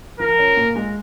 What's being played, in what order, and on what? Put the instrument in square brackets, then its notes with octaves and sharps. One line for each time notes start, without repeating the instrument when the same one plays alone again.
[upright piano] F3 [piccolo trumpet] A#4
[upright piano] C#4
A#2
G#3